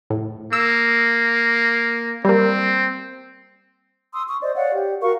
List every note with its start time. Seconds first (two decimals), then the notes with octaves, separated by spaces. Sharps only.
0.10 A2
0.53 A#3 E6
2.25 G3 A#3 C4
4.13 C6 D#6 E6
4.27 C#6 D#6
4.42 C5 D5 D#5
4.55 C#5 D5 F5 F#5
4.72 G4
5.01 F#4 A#4 F5 C#6